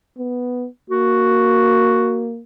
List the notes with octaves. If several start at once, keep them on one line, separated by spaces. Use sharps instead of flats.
B3
A#3 F#4